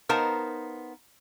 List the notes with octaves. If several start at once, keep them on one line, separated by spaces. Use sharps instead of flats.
B3 D#4 A#4 C5 F5 A5